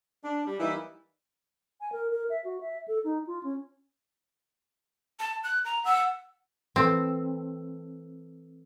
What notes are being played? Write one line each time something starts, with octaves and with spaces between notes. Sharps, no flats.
D4
G3
E3 G3 A#3 D#4 E4
G#5
A#4
A#4
E5
F#4
E5
A4
D#4
F4
C#4
A5
F#6
A#5
F#5 E6
E3 C4 A4 B4